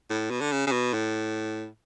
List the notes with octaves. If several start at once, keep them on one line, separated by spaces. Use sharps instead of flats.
A2
B2
D3
C#3
C#3
B2
A2